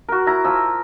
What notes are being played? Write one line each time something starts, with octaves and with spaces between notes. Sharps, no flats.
F#4 A#4
E4 A#5
F3 E6